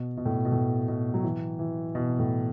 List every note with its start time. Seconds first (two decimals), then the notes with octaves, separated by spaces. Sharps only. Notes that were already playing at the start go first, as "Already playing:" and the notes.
Already playing: B2
0.17 B2
0.25 A2
0.34 B2
0.45 B2
0.52 A2
0.88 B2
1.14 F#3
1.23 E3
1.59 E3
1.95 B2
2.19 A2